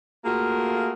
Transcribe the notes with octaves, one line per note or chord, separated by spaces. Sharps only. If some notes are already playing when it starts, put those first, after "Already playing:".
A3 A#3 F4 F#4 G#4 A#4